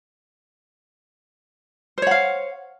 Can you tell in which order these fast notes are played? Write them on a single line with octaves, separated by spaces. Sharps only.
C5 C#5 F#5 F5